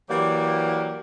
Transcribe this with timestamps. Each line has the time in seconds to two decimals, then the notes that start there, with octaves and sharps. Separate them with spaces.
0.10 E3 F#3 A#3 G4 D5